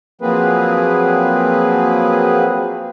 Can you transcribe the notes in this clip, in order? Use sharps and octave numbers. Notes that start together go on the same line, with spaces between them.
F3 F#3 A#3 C4 G#4 B4